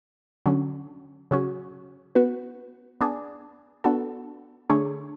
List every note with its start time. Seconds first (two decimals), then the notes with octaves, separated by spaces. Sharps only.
0.46 D3 F#3 C#4
1.31 C#3 F#3 C#4 F#4
2.15 B3 F#4 B4
3.01 B3 D4 G#4
3.84 B3 D4 F#4 A4
4.70 D3 A3 D4 G#4 C#5